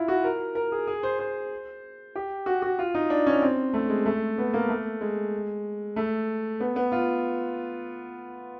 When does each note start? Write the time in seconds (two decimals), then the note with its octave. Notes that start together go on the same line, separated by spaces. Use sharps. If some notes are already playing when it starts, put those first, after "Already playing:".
Already playing: E4 F4
0.08 F#4
0.24 A#4
0.55 A#4
0.72 G#4
0.87 G#4
1.03 C5
1.19 C5
2.15 G4
2.46 F#4
2.62 F#4
2.79 F4
2.94 D#4
3.10 D4
3.26 C#4
3.42 C4
3.74 A3
3.89 G#3
4.06 A3
4.38 B3
4.54 A#3
4.69 A3
5.01 G#3
5.96 A3
6.60 B3
6.76 B3
6.92 F4